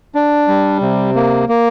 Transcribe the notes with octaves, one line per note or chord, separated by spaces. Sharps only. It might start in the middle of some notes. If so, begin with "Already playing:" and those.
D4
G3
C3
A#3
A#3